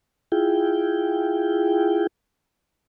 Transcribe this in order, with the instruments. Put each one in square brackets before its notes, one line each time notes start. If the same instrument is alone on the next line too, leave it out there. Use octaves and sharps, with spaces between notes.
[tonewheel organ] E4 F4 G#4 G5